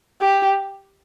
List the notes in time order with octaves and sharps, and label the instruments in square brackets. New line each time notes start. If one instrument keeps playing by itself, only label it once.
[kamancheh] G4